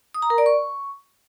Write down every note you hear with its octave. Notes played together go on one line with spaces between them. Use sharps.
D#6
A#5
A#4
D5
C#6